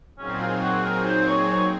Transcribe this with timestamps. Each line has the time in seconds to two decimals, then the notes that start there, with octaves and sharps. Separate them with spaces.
0.18 A#2 F#3 C4 C#4 D#4 G#4
0.40 F4
0.61 F#4
0.83 A#4
1.05 C5
1.26 C#5
1.48 C#5